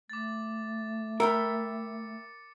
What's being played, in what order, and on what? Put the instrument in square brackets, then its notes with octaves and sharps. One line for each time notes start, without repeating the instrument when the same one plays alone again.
[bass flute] A3 [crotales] D6 A6
[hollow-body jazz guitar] A#4 [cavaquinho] E5 G5 B5 [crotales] C#7